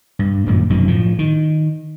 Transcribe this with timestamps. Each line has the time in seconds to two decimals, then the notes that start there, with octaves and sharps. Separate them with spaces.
0.19 G2
0.46 F#2 A#2 D#3 G#3
0.70 F1 F#2 B2 D#3
0.88 A2 F3
1.19 D#3